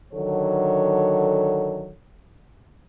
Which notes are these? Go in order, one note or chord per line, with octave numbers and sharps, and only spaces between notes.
D3 D#3 F#3 A4 C#5